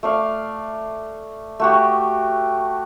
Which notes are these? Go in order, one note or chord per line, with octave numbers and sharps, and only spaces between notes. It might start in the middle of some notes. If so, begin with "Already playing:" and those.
A3 D5 F5
A3 F#4 G4